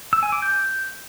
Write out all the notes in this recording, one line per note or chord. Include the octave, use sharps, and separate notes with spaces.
E6
G#5
D6
G6